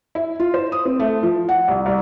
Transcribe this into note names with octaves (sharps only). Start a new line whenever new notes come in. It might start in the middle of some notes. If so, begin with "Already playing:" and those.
E4
F4
C5
D#6
C4
A3
F3
F#5
C2
C2